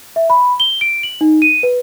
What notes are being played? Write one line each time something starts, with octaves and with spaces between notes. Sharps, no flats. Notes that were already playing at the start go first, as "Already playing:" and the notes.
E5
B5
G7
D7
F#7
D#4
D#7
B4